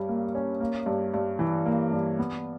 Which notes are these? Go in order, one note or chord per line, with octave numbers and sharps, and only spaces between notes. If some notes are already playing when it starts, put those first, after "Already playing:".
Already playing: G2 G3 C#4
A#3
C#4
A#3
G2
G2
E3
A#3
G2
B3